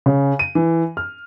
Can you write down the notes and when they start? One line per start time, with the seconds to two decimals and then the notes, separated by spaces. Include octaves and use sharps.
0.06 C#3
0.39 D#7
0.55 E3
0.97 F6